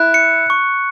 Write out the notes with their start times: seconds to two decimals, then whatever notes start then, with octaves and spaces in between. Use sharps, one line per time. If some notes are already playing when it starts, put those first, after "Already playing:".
Already playing: E4 F#6
0.14 C#7
0.50 C#6